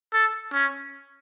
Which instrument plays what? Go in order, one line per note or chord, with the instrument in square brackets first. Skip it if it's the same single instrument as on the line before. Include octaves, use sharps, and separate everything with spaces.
[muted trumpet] A4
C#4